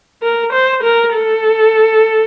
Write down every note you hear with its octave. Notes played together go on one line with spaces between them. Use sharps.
A#4
C5
A#4
A4